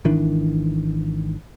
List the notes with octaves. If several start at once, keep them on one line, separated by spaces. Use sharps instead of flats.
G#1 D#3 E3 D4